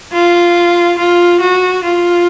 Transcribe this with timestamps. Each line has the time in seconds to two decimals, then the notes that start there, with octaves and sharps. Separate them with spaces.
0.12 F4
0.98 F4
1.40 F#4
1.84 F4